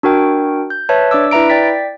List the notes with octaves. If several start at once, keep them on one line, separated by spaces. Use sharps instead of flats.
D4 F#4 A#4 G5
G6
B4 C#5 E5 A5
D4 D5 D6 E6
E4 B4 E5 A#5 D7
D5 G5 A6 B6